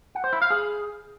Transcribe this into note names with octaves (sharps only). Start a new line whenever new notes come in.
F#5
C5
E4
F5
G#4